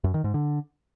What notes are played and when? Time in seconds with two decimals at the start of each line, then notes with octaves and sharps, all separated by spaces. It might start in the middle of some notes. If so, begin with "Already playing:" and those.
0.04 F#2
0.14 D#3
0.24 G#2
0.34 D3